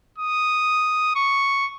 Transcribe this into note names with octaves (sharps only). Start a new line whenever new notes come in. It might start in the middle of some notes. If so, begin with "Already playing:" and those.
D#6
C#6